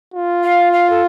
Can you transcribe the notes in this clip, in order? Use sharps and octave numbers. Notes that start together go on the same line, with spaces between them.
F4
F5
F5
A4